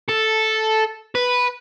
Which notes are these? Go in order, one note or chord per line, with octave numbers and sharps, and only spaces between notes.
A4
B4